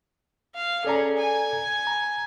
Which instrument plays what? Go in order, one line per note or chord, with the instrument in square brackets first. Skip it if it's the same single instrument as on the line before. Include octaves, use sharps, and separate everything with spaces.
[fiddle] F5
[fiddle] C#4 G#4 [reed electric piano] A4 D5 A#5
[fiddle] G#5
[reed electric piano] A#5